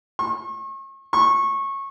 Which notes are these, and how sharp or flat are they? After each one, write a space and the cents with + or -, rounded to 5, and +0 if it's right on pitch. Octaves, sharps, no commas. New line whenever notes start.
C#6 -40
C#6 -20